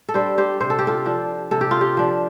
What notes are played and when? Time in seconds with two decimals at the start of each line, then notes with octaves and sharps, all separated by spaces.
0.09 A4
0.14 G3 D4 G4 C5
0.38 G4 C5
0.60 C3 C5
0.70 A4
0.79 G4
0.87 F4 A4
1.06 F3 D4
1.51 C3 A4
1.61 G4
1.71 F4
1.81 G4
1.97 F3 D4